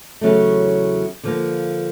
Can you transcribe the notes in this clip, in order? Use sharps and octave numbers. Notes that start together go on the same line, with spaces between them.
E2 C#3 F#3 A3
D3 F3 A#3